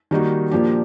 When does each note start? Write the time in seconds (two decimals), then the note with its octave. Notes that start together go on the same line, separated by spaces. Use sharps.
0.11 D#3 G3 A#3 D#4 F#4
0.51 A#2 F3 A#3 D4 G4